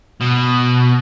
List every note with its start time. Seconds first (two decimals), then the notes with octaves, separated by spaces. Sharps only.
0.21 B2